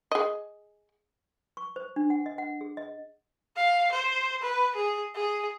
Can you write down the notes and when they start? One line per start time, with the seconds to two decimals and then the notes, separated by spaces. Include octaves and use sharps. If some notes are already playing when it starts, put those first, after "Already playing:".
0.12 G#4 D#5
1.57 C#6
1.76 C5
1.96 D4
2.10 F#5
2.26 D#5
2.38 F#5
2.61 G#4
2.77 D#5
3.57 F5
3.92 C5
4.42 B4
4.76 G#4
5.15 G#4